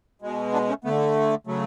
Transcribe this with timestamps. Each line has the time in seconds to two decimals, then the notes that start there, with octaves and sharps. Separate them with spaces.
0.22 B2 G#3
0.52 B3 D4
0.68 A3 C#4
0.84 D3 A3 B3
1.47 C#3 F#3 A3